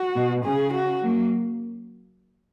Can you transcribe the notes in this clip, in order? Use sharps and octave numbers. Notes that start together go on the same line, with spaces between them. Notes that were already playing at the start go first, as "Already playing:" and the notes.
Already playing: F#4
B2
C#3 G#4
F#4
F#3 A#3